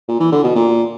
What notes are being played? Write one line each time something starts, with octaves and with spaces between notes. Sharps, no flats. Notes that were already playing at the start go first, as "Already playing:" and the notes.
A#2
E3
D3
B2
A#2